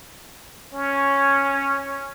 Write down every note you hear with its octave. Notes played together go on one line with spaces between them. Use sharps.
C#4